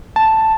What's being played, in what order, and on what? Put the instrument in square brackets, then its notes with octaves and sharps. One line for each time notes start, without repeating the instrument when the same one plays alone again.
[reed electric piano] A5